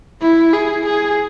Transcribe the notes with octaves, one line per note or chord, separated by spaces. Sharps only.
E4
G#4
G#4